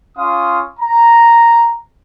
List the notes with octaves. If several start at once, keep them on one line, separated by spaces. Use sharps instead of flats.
C#4 F4 F5 C6 D#6
A#5